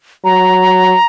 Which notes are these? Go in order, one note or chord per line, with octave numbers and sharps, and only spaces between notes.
F#3 A#5